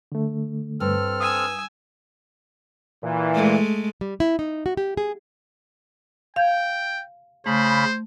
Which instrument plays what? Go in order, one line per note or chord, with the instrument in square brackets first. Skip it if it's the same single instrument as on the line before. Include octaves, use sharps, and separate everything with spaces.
[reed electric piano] D3 A3
[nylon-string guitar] G2 [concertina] C4 A4 F6
[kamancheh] G#5 E6 [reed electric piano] D#6
[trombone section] A#2 E3
[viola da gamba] G#3 A3
[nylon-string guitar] G3
E4
D#4
F#4
G4
G#4
[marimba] F5 G6 G#6 [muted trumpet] G5
[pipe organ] C#3 B5 [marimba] A3 [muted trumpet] C5